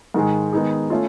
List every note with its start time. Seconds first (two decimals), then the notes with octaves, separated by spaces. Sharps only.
0.14 G#2 D#3 G#3
0.53 D#3 G#3 B3 D#4 G#4
0.90 A3 C#4 F4